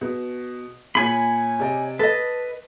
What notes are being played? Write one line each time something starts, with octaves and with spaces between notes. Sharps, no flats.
B2
A#2 C#5 G#5 B5
C3 D5 D#5
A4 B4 D#5 A5